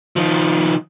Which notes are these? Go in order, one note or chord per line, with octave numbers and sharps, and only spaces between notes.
D#3 F3